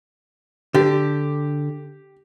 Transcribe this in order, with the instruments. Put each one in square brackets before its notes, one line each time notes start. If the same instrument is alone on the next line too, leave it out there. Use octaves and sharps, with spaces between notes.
[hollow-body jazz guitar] D3 [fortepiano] G4